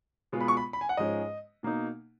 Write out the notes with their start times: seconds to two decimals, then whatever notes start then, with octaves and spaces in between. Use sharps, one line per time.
0.32 B2 G#3 B3 F4
0.41 B5
0.48 C#6
0.57 B5
0.73 B5
0.81 G#5
0.89 F#5
0.97 G#2 F3 G#3 C#4 D#5
1.63 B2 A#3 D#4